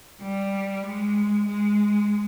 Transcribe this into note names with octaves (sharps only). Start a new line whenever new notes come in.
G3
G#3
G#3